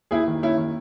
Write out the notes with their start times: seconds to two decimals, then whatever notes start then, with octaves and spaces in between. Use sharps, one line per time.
0.11 D#2 E4 G#4
0.28 D#3
0.43 D#2 C#4 E4
0.58 D#3